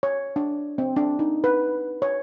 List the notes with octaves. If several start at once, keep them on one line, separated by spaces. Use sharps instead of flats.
C#5
D4
C4
D4
D#4
B4
C#5